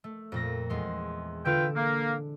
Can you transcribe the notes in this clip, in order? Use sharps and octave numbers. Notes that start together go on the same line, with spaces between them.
A3
F2 A#2 A#6
E2 G#3 C6
D3 F4 A4 B4 G5 D7
A#3